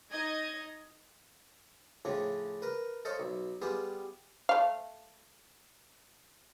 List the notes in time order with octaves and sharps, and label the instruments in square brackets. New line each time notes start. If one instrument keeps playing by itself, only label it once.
[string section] D#4 D#5 G#6
[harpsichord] A2 C#3 F3 D4
A#4 B4
A4 C5 C#5 D#5 F5
B1
G3 B3 F4 G4 G#4
[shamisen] A3 F5